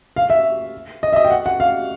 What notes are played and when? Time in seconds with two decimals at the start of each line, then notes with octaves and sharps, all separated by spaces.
0.16 F5
0.30 E5
1.03 D#5
1.13 E5
1.16 D#5
1.25 G5
1.31 F#5
1.46 F#5
1.60 F5